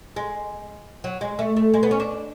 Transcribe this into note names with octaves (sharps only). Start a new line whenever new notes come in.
G#3
F#3
G#3
A3
A3
G#3
B3
C#4
D4